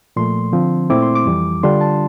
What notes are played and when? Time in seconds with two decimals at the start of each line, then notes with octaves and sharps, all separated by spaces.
0.16 A#2 F3 A3 C6
0.52 D3 F3 C4
0.90 A#2 A3 C4 E4 D6
1.03 C6
1.15 D6
1.26 F2 E3 G3
1.63 D3 G3 D4 F4 C6
1.81 A5